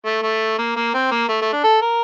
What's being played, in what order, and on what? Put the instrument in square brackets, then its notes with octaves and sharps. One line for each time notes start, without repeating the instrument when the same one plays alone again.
[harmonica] A3
A3
A#3
A#3
C4
A#3
A3
A3
D4
A4
A#4